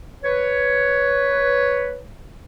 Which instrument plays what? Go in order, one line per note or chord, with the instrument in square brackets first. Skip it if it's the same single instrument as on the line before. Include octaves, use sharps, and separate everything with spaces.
[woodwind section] B4 C#5